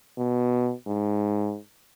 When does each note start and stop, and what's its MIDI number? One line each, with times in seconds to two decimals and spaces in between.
0.18 0.73 47
0.87 1.58 44